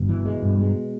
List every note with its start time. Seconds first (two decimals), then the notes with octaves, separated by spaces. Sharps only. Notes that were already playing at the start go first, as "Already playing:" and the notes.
Already playing: G1 B2
0.09 E3
0.25 G#3
0.42 G2
0.59 G#3